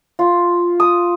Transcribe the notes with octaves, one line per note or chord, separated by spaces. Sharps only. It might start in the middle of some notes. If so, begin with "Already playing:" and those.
F4
D#6